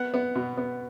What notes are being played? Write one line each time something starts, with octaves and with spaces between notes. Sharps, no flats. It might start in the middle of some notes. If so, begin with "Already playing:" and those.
Already playing: B3 F#5
B3
B2
B3